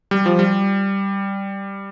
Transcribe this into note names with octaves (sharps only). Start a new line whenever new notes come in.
G3
F3
G3